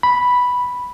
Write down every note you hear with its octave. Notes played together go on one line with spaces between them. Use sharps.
B5